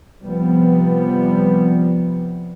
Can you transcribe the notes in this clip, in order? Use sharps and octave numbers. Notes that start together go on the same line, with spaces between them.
C3 F3 G3 B3